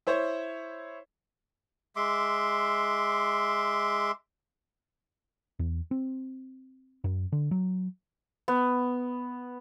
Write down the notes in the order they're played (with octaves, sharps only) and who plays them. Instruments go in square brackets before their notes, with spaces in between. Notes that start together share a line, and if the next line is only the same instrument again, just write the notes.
[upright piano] E4 C5 C#5
[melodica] G#3 E5 C6 D6
[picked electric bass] E2
C4
F#2
D3
F#3
[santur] B3